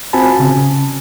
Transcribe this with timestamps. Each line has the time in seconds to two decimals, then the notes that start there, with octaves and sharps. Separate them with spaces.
0.13 C4 F4 F#4 G#5 A5 B5
0.40 C#3